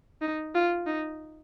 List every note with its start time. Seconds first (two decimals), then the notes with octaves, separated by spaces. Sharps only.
0.22 D#4
0.55 F4
0.87 D#4